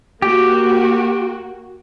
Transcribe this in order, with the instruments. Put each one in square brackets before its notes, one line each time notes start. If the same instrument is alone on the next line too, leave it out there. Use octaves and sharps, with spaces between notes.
[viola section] A#3 F#4 [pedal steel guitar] G4